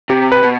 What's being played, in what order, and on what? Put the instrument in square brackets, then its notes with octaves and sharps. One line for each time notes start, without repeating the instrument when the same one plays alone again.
[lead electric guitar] C3 [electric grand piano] G4
[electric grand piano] B4
[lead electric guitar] B2